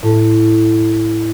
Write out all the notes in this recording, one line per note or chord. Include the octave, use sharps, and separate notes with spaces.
A2